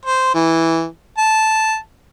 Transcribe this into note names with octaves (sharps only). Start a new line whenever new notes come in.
C5
E3
A5